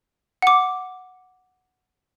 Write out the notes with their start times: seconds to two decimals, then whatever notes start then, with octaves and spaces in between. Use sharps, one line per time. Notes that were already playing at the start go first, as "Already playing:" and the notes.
0.42 F#5 D6